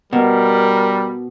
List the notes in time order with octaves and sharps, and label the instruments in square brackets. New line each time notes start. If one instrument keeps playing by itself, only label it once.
[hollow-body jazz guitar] B2 [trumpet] G3 [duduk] A#4